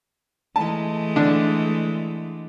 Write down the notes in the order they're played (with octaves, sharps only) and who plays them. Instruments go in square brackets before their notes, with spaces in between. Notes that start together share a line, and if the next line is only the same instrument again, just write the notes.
[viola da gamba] E3 G#3 A3 [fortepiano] A5
[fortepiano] D3 D4